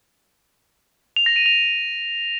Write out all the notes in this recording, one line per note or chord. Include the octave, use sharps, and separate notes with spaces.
F7
A#6
D#7
F7